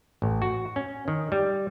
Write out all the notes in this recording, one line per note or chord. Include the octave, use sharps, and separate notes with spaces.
A1
F#4
C#4
D#3
G3